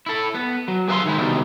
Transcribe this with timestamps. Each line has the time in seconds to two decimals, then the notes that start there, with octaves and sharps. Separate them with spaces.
0.06 E4 A4
0.35 B3
0.68 F#3
0.88 G#4 B4 E5 F5 A5 C6
1.05 D#3 G#3 E4
1.18 C2 B2 D#3 E3 G3 G#3